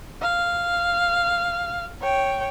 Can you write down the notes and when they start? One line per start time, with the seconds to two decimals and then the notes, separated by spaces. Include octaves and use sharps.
0.22 F5
2.02 C#5 G5